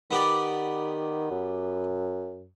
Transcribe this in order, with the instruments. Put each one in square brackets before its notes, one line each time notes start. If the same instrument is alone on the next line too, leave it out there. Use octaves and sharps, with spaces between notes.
[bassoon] D#3 [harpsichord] B3 G4 D5
[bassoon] F#2